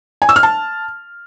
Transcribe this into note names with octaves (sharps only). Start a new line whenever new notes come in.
G#5
E6
F6
A5